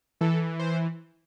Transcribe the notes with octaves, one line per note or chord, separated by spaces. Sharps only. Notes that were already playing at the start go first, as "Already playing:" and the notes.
E3 A4
C5